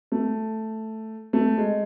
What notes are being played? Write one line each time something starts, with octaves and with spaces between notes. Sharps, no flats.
A3
A3
G#3